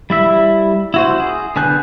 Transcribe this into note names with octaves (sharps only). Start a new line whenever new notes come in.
G3 E4 E5
E4 F#4 C5
G#4
D3 B3 G#5 F#6 G6